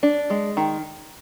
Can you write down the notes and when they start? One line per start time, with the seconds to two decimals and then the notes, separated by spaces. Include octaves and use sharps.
0.03 D4
0.30 G#3
0.57 D#3